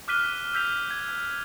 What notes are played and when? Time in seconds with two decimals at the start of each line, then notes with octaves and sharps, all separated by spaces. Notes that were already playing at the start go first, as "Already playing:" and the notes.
0.08 D6 F6 F#6 B6 D#7 G7
0.54 E6 G6 B6 F7
0.91 G#6